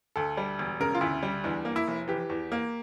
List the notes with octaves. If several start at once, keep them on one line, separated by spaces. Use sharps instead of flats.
D2 A4
G3
E1
C#3 A#4
F4
D2 E4
G3
E2 D4
A#3
E4
F1
E3 G4
E2
A#3